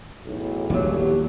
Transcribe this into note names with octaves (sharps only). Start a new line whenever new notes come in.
B1 E2 A2
D#2 A#2 F#3 G3 G4